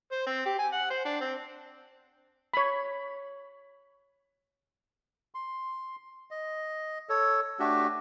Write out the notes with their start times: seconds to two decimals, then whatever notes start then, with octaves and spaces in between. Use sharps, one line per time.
0.12 C5
0.27 C4
0.46 G4
0.59 G#5
0.73 F#5
0.90 C5
1.05 D4
1.21 C4
2.54 C#5 B5
5.35 C6
6.31 D#5
7.09 A4 C#5
7.60 A3 D4 F#4 G4